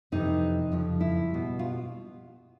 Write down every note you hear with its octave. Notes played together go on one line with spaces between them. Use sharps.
F2 C3 E3 D#4
F2 C#3 F3
E4
B2 G3
F4